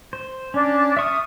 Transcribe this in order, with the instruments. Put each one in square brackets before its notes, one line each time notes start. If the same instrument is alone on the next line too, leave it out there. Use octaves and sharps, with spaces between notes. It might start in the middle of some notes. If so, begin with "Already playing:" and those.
[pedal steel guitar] C5
[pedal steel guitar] C#4 [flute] D4
[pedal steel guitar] E5 C#6 F6 [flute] D#6